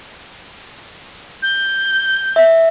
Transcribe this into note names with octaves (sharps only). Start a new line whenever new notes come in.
G6
E5